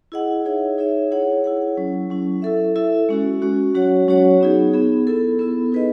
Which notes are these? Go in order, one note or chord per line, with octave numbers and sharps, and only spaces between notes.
E4 G#4 D#5 F#5
D#4 G#4 C#5 E5
D#4 G#4 C#5 E5
E4 G#4 C#5 F#5
E4 G#4 C#5 F#5
F#3 C#4 E4
F#3 C#4 E4
E4 A4 E5
E4 A4 E5
G#3 C#4 F#4
G#3 C#4 F#4
F#3 C#4 F#4 C#5 F#5
F#3 C#4 F#4 C#5 F#5
B3 D#4 G#4
B3 D#4 G#4
B3 E4 A4
B3 E4 A4
D#4 G#4 B4 D#5